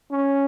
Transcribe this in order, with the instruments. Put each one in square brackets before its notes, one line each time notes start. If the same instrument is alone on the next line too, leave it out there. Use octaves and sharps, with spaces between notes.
[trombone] C#4